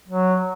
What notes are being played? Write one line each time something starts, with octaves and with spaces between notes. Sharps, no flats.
F#3